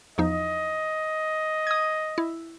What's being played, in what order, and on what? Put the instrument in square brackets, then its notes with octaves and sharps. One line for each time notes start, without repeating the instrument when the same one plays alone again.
[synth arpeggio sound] E2 F3 D#4 [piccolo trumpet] D#5
[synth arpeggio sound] D#6 G#6
E4